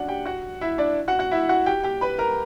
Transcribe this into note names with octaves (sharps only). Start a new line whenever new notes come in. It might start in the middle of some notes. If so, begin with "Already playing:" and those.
Already playing: C#4 D4 F#4 D5 F#5
G4 G5
F#4 F#5
E4 E5
D4 D5
F#4 F#5
F#4 F#5
E4 E5
F#4 F#5
G4 G5
G4 G5
B4 B5
A#4 A#5